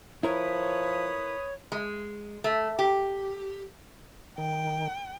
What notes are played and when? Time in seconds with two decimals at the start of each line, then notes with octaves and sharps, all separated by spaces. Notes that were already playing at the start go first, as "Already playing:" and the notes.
0.23 F3 E4 A#4 B4 C#5 B5 D#6
1.72 G#3
2.44 A3
2.79 G4
4.38 D#3 G5